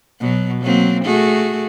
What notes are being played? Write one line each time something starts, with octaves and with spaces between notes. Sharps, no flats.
B2 F#3
F#3 A#3 C4
A3 F#4 G#4